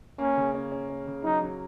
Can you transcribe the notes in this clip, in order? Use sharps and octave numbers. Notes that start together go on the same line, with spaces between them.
A#3 C#4
C#3
C#4
C#4
C#4
C#3
F#3 D#4
F#3